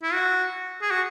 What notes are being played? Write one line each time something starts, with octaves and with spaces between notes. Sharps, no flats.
E4
F#4
G#4
F#4